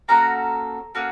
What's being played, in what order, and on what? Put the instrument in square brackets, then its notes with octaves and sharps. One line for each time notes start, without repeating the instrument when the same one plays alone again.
[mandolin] A#3 C#4 F#4 A4 A#5
A#3 C#4 F#4 A4